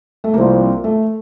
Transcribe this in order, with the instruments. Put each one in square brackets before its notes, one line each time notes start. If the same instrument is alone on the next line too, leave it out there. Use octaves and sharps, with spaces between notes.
[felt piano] A3
[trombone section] C2 C3 F3 [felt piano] A#3
[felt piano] A3